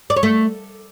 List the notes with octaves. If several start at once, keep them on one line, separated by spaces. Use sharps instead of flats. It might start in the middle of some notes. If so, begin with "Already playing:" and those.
D5
C#5
A3